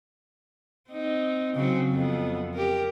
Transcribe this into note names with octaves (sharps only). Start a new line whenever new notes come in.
C4 D#4
C#3 F#3 C4
F2 B3
G4 A#4